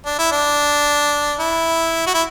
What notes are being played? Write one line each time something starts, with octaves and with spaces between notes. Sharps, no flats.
D4
E4
D4
E4
F#4
E4